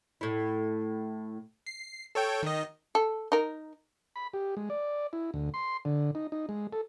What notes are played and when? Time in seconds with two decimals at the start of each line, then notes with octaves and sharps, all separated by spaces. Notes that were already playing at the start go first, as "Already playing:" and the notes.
0.21 A2 E4
1.66 C7
2.15 A4 C#5 G5
2.43 D#3 D#5
2.95 A4
3.32 D#4 A#4
4.16 B5
4.34 G4
4.57 G#3
4.70 D5
5.13 E4
5.34 D2
5.54 C6
5.85 D3
6.15 D#4
6.32 D#4
6.49 G#3
6.73 A4